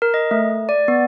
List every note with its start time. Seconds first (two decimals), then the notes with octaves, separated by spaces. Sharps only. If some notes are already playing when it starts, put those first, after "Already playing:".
0.02 A#4
0.14 D#5
0.31 A3
0.69 D5
0.88 B3